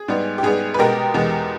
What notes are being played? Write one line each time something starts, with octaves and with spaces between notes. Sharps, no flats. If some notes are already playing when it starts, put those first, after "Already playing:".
Already playing: G#4
G#2 G3 B3
G4
G#2 G3 B3 G#4
B4
B2 G#3 B3 G4 A#4
E2 B2 G#3 B3